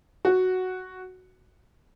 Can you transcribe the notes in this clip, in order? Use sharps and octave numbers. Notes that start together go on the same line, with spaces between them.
F#4